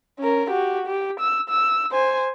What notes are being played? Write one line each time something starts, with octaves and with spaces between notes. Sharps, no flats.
C#4 A#4
F#4 G4
G4
E6
E6
C5 G#5